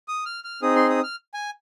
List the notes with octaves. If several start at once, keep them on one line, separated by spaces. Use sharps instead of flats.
D#6
F6
F6
C4 D#4 G#4 D#6
C6
D#6
F6
G#5